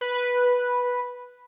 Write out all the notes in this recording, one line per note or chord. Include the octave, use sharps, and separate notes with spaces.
B4